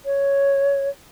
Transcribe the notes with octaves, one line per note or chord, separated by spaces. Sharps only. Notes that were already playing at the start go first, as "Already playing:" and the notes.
C#5